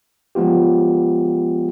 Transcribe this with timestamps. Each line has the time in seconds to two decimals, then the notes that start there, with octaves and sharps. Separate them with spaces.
0.35 F3 G#3 B3 F4 G4